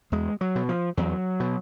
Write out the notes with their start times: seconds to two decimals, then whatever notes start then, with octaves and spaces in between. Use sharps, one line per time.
0.12 E2 G#3
0.41 F#3
0.55 B2
0.69 F3
0.97 E2 F#3
1.40 B2